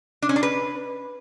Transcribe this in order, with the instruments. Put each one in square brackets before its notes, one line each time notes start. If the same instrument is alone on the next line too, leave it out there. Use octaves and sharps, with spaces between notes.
[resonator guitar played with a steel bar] D4
C#4
D4
B4